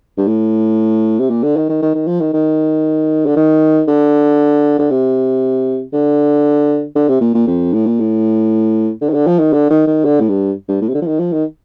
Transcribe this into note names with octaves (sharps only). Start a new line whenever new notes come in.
G2
A2
C3
A#2
D3
D#3
D#3
D#3
D#3
F3
D#3
D#3
D3
D#3
D3
D3
C3
D3
D3
C3
A#2
A#2
F2
A2
A#2
A2
D3
D#3
D3
F3
D#3
D3
D#3
D#3
D3
A2
G2
G2
A2
C3
D3
F3
D#3
F3
D#3